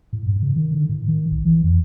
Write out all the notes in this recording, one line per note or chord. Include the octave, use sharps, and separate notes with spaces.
A2
G2
C#3
D#3
D3
A2
D#3
C2
E3
F2